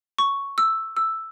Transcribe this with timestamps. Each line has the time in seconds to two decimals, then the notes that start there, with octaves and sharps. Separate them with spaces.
0.19 C#6
0.58 E6
0.97 E6